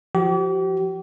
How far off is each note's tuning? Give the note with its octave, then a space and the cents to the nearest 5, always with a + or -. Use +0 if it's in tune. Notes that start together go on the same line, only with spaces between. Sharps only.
F3 +0 G4 -40